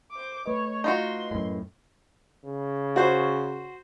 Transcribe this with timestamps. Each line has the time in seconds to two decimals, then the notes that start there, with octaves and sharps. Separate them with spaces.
0.11 C5 D6
0.46 A3 B4 C#5 D#5
0.84 D#4 F4 F#4 C6
1.31 F#2 A2
2.45 C#3
2.96 F#4 C5